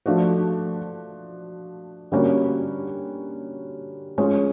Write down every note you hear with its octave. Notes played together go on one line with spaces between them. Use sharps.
F3 A3 D4 F#4
D3 G3 A#3 C#4 F#4
G#3 C#4 F4 G#4